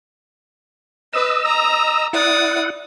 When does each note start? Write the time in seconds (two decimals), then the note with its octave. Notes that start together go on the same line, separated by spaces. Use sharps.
1.13 B4 D#5 E6
1.45 A#5
2.13 E4 D5 F#5 D#6